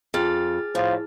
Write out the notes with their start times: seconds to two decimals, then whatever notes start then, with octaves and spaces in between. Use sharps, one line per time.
0.14 F2 G#4 F6 A6
0.75 A2 F3